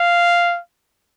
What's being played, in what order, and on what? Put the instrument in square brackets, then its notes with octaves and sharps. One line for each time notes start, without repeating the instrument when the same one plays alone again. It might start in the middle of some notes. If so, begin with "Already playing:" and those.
Already playing: [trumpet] F5